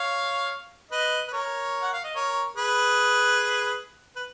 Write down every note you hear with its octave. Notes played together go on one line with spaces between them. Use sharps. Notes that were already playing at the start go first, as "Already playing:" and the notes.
Already playing: C#5 F5
B4 D#5
B4
A#4 C#5
F#5
F5
D#5
A#4 C#5
G#4 B4
B4